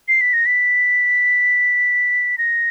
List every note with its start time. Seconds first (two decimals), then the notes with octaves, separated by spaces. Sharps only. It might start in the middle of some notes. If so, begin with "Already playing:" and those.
0.08 C7
0.21 B6
0.33 A#6
0.46 B6
2.38 A#6